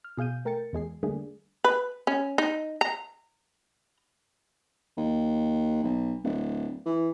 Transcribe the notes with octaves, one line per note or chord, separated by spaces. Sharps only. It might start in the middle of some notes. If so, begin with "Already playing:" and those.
F6
B2 G#4 F5 G6 D#7
A3 A#4 G5 A6 C#7
E2 G#3 G#4 C7
D3 G3 A3 A#3 D4 G#4
B4
C#4
D#4
A#5
D#2
B1
D1
E3